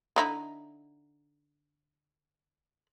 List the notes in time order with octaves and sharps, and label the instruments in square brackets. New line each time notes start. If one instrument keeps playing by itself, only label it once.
[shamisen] D3 D#4 E4